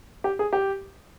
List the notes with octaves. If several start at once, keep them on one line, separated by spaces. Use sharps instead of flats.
G4
G#4
G4